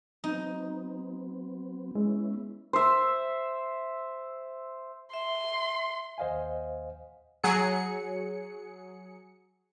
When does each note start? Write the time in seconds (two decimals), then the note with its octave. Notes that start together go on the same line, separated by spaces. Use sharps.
0.24 F#3 B3 C4 D#4
1.95 G#3 B3 C#4 E4
2.73 C5 E5
5.14 E5 C6
6.18 D#2 C5 D#5 F5 F#5 G#5
7.44 F#3 G#4 C#7